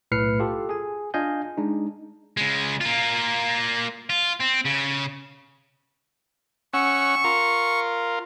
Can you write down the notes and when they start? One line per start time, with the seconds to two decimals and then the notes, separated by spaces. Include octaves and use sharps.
0.12 B1 A2 B4 F6 C7 C#7
0.40 F4 G4 A4
0.69 G#4 G#5
1.14 D4 F4 D#5 F5 G#5 G6
1.58 G#3 D4 D#4
2.37 C#3 G#3
2.81 A#3 F4
4.10 F4
4.40 C4
4.65 C#3
6.74 C#4 F#5 C#6 E6
7.24 F4 A#4